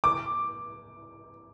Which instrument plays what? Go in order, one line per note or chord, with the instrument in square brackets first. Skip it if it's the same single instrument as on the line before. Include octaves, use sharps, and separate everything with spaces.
[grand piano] D6